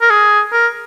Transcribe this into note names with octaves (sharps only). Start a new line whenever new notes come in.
A#4
G#4
A#4